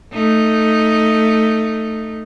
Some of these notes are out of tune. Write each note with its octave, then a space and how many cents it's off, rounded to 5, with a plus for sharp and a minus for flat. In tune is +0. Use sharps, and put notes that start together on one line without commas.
A3 +10 D#4 +0